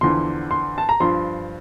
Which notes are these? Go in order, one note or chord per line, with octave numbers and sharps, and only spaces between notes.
E2 D3 F3 C6
C6
A5
A#5
G2 F3 C6